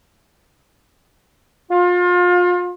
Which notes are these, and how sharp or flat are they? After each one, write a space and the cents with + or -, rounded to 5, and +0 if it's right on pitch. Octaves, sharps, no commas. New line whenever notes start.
F4 +30